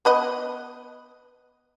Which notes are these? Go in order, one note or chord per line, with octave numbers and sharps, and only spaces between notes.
B3 B4 D#5